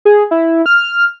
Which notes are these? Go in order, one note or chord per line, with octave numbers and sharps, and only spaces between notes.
G#4
E4
F6